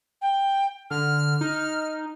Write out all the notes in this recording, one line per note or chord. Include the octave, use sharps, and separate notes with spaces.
G5
D3 F6
D#4